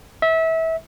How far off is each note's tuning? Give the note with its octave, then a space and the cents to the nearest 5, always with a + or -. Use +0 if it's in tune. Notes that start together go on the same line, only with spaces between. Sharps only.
E5 -25